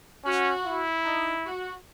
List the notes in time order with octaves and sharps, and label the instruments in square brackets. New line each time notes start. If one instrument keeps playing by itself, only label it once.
[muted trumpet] C#4 [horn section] F#4
[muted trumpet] E4
[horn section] D#4
F#4